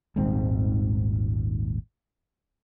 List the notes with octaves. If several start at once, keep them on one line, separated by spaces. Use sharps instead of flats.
D#1 G#1 G#2 C4